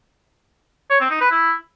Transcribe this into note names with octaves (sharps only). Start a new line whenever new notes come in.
C#5
C4
D#4
B4
E4